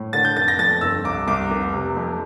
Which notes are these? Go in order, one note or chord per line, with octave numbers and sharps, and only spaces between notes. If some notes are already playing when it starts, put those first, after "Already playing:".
Already playing: A2
D3 A6
G6
F1 A6
A#6
F2 A6
G1 E6
C2 D6
C2 D6
F1
C3
F2